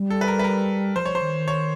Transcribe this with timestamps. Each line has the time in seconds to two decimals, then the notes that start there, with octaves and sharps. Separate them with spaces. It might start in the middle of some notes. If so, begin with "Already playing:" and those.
Already playing: G3
0.10 A4
0.21 B4
0.28 A#4
0.39 B4
0.44 A#4
0.96 F3 C5
1.06 C#5
1.15 C5
1.22 D#3
1.48 C#5